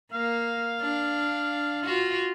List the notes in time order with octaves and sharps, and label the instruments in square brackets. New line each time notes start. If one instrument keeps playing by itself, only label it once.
[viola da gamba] A#3 [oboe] F5
[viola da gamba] D4
F4 F#4